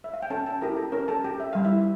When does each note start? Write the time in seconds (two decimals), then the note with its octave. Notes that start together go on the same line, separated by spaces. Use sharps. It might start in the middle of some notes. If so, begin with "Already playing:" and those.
0.04 E5
0.14 F5
0.22 G5
0.30 C#4 A4 A5
0.46 A4 A5
0.61 E4 G4 A#4 A#5
0.77 A4 A5
0.92 C#4 A#4 A#5
1.08 A4 A5
1.24 G4 G5
1.40 E5
1.53 G3 F5
1.65 E4 E5